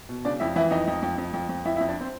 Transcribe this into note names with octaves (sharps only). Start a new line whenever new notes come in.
B2
C#3 D4 D5
F2 E4 E5
E3 E4 E5
F2 D#4 D#5
F2
F2
F2
F2
F2
F2 E4 E5
E4 E5
F2
D4 D5
C4 C5